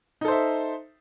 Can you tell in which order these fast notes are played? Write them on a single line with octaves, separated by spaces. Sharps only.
D#4 A4 C5 E5